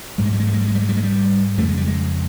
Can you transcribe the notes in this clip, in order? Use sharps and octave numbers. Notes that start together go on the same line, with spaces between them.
G#2 G3
G#3
G3
G#3
G3
G#3
G3
G#3
G3
G#3
G3
G#3
G3
F2 C#3 A3
G#3
G3
G#3